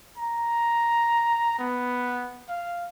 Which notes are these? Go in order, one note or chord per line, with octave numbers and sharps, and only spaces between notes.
A#5
B3
F5